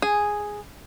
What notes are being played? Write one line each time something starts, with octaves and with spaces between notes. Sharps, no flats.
G#4